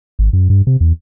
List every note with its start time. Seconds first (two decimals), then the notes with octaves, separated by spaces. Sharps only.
0.19 G#1
0.33 F#2
0.50 G2
0.67 C3
0.80 E2